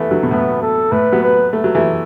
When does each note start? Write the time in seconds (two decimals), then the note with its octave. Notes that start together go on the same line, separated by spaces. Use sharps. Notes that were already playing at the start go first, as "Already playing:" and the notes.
Already playing: E3 A3 B3
0.10 D3 F#3
0.23 B2
0.31 A2 B3
0.62 A4
0.92 A2 B4
1.12 F#3 B3
1.23 B4
1.53 A3
1.64 F#3
1.75 E3 A3